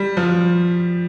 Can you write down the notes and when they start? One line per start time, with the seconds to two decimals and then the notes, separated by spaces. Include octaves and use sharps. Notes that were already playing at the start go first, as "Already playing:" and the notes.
Already playing: G3
0.17 F3